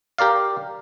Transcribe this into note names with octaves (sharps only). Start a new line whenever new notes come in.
G4 A#4 D5 F5